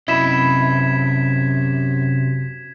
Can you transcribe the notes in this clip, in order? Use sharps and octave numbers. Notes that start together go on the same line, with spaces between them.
F#2 C3 E4 D#5 G#6 B6 E7